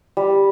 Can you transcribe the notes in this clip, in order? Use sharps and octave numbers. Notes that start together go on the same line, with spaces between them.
G3